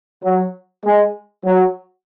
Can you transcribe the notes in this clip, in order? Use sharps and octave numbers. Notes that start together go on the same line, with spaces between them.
F#3
G#3
F#3